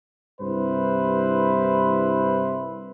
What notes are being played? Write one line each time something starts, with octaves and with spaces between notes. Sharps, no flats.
C2 G2 E4 B4 C5